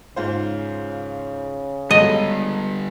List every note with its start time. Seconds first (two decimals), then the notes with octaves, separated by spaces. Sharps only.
0.16 G#2 C#3 F4 C5
1.91 D3 G3 G#3 F#4 A4 D#5